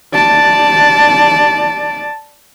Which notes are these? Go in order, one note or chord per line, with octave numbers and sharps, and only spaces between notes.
D5 A5